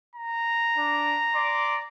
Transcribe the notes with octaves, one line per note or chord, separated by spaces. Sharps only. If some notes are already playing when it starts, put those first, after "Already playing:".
A#5
D4
D5 C6 D6